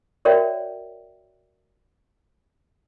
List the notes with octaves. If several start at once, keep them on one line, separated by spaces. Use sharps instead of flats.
F#4 A#4 C#5 D5 E5 G5